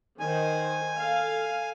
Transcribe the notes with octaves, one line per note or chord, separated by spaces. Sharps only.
D#3 C5 G#5
A4 F5